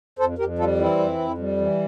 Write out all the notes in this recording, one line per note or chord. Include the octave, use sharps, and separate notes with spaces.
F2 A4 C5
F2 G4 A#4
G3 F4 A4
E3 C4 E4
F2
F2
G3
E3